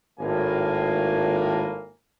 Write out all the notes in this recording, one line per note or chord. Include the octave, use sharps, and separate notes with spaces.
G#1 A2 A#3 G#5